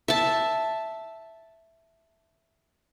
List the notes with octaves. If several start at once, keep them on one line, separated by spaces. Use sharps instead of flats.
E5 A5